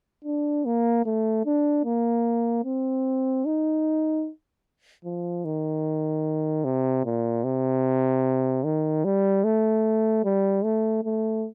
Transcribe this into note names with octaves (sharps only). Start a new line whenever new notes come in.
D4
A#3
A3
D4
A#3
C4
D#4
F3
D#3
C3
A#2
C3
D#3
G3
A3
G3
A3
A3